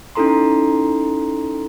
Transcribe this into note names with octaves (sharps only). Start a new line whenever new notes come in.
C#4 D#4 E4 A4 A#5 C6